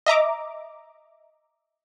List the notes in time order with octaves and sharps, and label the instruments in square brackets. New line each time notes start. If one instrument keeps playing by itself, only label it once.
[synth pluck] D#5 E5 A#5 D6